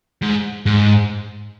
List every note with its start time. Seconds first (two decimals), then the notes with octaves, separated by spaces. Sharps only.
0.22 G#2
0.66 G#2